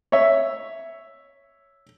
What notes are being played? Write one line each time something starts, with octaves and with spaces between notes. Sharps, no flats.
C#5 E5